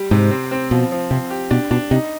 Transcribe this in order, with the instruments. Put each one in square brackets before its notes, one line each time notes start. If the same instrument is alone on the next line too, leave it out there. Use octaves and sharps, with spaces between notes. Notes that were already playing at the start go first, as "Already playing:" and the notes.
Already playing: [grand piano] G3
[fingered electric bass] G#2 [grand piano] C3
[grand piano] C4
C4
[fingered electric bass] B2 [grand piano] F3
[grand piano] F3
[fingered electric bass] C3 [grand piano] C4
[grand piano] G4
[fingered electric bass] B2 [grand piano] D4
[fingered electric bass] B2 [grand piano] D4
[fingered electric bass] C3 [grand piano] D#4